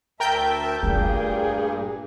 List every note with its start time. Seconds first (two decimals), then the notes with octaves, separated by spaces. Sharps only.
0.20 D2 A#4 E5 G5 A5 G6
0.83 G2 A#2 A3 A#3 G#4